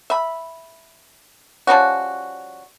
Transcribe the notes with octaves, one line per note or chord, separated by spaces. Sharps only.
E5 B5
F3 G3 C#4 F#4